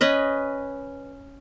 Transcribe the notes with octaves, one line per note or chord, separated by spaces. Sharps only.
C#4 B4 D#5